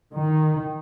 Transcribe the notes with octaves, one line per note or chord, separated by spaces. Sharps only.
D#3